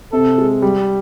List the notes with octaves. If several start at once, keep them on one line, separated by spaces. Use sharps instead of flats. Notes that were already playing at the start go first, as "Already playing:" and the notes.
C3 A4
G#3
G3